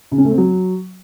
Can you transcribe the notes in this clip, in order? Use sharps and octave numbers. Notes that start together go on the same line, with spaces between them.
C#3
C#4
A3
C4
F#3